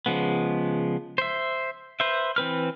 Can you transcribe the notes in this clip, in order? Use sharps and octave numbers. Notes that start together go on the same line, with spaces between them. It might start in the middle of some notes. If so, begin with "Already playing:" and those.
C#3 F3 G#3 B3
C5 E5
B4 C5 E5
E3 C4 B4 F6